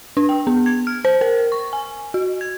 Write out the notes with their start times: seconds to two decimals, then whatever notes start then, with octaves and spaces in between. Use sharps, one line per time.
0.17 D4
0.29 G5
0.47 B3
0.66 G#6
0.87 F6
1.05 C5
1.21 A#4
1.52 C#6
1.73 G#5
2.14 F#4
2.41 G#6